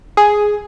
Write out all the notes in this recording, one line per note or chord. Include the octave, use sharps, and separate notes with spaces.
G#4